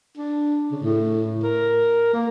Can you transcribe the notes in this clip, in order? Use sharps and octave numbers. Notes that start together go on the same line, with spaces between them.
D4
C#3
A2
A#4
A#3